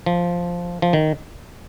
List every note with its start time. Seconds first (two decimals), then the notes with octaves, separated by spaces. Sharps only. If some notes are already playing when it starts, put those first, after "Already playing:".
0.06 F3
0.82 F3
0.93 D#3